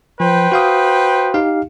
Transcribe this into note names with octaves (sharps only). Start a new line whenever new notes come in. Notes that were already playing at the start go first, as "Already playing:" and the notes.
F3 B4 C5 G5
F#4 F5 D#6
D#4 G4 F5